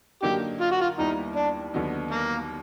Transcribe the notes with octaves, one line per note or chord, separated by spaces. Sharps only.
D3 F#3 A#3 D#4 G4
F4
F#4
F4
D#2 D#3 G3 B3 D#4 E4
D4
D#2 D3 F#3 B3 D#4
A#3